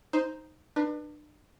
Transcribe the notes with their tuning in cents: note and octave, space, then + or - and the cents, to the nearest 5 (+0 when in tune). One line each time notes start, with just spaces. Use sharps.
D#4 +0 C5 +0
D4 +35 B4 -20